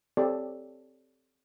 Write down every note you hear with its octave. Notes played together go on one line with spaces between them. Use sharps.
C4 G4 A4 C#5 D5